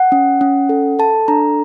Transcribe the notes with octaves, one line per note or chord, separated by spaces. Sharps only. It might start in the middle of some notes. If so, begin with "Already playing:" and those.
Already playing: F#5
C#4
C#4
A4
A4 A5
D4 A#5